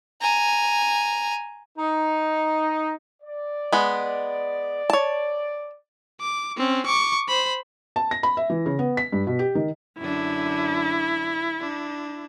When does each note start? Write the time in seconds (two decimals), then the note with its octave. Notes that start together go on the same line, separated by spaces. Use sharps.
0.22 G#5 A#5
1.77 D#4
3.22 D5
3.72 G#3 B3
4.90 C#5 A5
6.21 D6
6.57 C4 C#4
6.86 C#6 D6
7.28 C5 B5
7.96 A5
8.11 A#6
8.23 B5
8.37 E5
8.50 E3
8.66 C#3
8.79 B3
8.97 B6
9.12 G2
9.27 B2
9.39 G4
9.55 D#3
9.99 F#2 D3 D4 E4
11.60 D4